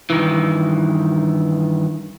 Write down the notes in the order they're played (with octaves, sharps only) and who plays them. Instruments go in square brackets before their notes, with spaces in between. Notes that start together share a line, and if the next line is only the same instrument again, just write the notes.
[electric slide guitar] G2 D#3 E3